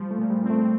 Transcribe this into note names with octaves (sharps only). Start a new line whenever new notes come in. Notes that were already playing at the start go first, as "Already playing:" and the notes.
Already playing: F3 G3
A3
A#2
G3
C4
A3